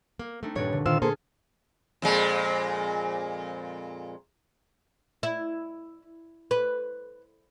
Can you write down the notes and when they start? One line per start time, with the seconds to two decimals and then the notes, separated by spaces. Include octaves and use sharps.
0.19 A#3
0.43 A3 C4 D4 D#4
0.55 D#1 G2 D4 B4 C#5
0.73 D3
0.86 A#2 D#3 F4 C5 E6 F6
1.02 A#2 A#3 G#4 A4 C5
2.02 F2 A#2 G#3
5.23 E4
6.51 B4